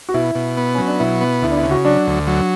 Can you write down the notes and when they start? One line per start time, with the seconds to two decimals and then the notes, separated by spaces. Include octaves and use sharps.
0.09 F#4
0.14 B2 E4
0.35 B2
0.57 B3
0.75 F#3 C#4
0.87 D4
0.99 B2 E4
1.21 B3
1.42 D2 E4
1.51 D4
1.57 E4
1.63 C#3
1.71 F#4
1.85 F#3 D4
2.07 D2
2.27 F#3